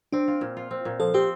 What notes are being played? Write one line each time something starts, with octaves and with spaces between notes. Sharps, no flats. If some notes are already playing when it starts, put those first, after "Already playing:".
C4 D4
F4
A#2
F4
C4
A#2
F3 A4
C4 G4